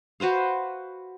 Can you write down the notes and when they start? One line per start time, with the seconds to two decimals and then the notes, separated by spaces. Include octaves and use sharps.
0.20 F#4 B4 C5 F5